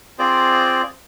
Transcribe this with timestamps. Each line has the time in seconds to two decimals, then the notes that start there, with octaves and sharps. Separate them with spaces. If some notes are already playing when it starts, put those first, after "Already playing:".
0.19 C4 F4 G#4 C5 D5